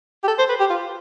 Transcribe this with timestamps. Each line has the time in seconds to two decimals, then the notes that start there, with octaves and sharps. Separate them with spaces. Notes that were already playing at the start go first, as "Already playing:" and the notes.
0.24 G4
0.28 A4
0.39 C5
0.49 B4
0.60 G4
0.70 F4